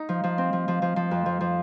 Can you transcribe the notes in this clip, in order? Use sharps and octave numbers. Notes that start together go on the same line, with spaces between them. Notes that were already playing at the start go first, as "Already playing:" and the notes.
Already playing: D#4
F3
F3
C4
F3
F3
F3
F3
F2
F3
F3